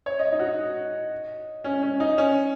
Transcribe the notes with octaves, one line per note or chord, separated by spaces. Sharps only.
C#5
D#5
D#4
F#4
D#4
C#4
C#4
D#4
C#4